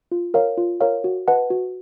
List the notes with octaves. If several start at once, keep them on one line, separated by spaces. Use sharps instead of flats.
F4
A#4 C#5 F5
F4
A#4 C#5 F5
F#4
B4 D#5 F#5 A5
F#4